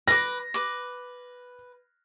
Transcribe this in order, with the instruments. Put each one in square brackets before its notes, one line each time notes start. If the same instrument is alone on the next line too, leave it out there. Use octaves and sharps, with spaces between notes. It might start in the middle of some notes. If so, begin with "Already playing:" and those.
[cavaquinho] B4 D6 [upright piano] A#6
[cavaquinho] B4 D6